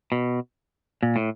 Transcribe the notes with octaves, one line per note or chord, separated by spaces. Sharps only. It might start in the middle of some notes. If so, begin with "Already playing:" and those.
B2
A#2
A2